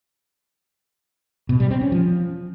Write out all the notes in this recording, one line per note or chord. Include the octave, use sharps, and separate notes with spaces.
B2
G3
C4
C#4
F3